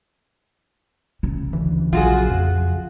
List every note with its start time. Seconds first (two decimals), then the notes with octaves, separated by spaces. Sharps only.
1.23 C#3
1.53 D2 E3
1.93 A#1 A#2 F#3 F4 F#4 G#4
2.30 F2